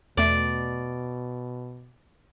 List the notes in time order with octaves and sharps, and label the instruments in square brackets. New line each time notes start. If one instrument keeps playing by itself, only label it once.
[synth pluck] E2 A3 [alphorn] B2 [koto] D5